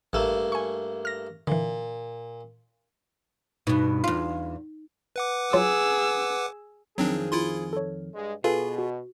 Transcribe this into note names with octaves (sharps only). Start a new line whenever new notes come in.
A1 G2 A3 A#3 E6
G#5 C#6
F6 A#6
A#2 D3 E3
G2 B2 D#4
E2 F4
B4 F#5 D6
F#3 F4 G#4 E6
F2 D#3 F3 F#3 C4 D4 G#4
E4 F4 C6
A4 C#5
G2 G#3
B2 F4 G#4 A4 B4 F5
F#4